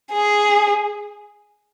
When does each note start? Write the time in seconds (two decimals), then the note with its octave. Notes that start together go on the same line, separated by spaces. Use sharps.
0.13 G#4